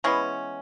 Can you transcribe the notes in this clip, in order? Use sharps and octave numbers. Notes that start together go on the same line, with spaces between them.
E3 G#3 B3 C#4